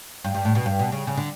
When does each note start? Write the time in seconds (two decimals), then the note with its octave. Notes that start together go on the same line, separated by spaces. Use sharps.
0.24 G2
0.34 G2
0.45 A2
0.55 B2
0.66 G2
0.79 B2
0.92 C#3
1.07 C#3
1.17 D3